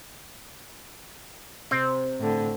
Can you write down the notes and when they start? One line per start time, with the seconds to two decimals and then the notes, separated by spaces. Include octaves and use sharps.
1.71 C3 C4
2.18 A2 D3